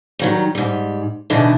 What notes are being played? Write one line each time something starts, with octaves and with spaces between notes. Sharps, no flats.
D#3 F#3 G3
G#2 G3
B2 D3 E3 D4 D#4